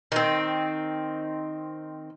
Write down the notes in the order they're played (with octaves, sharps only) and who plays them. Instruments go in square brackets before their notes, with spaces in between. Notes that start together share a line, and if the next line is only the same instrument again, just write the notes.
[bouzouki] D#3 C4